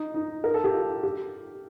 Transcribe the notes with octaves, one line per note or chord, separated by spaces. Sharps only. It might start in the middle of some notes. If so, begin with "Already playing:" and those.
Already playing: D#4
D#4
A#4
A4
G4
F4
G4